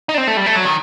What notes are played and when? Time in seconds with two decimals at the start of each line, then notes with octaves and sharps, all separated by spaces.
0.09 D#4
0.14 D4
0.18 C4
0.27 A3
0.37 G3
0.46 A3
0.56 F#3
0.65 D#3